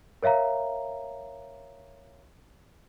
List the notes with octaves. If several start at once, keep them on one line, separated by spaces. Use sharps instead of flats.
A#4 C#5 E5 F5 A#5